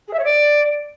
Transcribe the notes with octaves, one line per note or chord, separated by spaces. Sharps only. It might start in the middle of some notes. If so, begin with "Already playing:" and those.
G#4
E5
C#5
D5